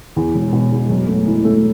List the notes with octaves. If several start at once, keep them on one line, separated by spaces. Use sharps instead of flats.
E2
E1
B2
E1
F#2
A3
E3
A3